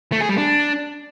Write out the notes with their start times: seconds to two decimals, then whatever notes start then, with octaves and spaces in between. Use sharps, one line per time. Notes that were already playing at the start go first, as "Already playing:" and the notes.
0.12 A3
0.21 G#4
0.29 G3
0.38 D4